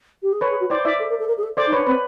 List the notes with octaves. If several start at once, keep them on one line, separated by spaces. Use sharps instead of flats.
G4
G#4
A4 B4 C#5
G#4
F#4
E4 C5 D5
E4 D5 E5
A4
A#4
A4
A#4
G#4
A4
A4 C5 D5
D#4
D4 B4 C#5
C4 B4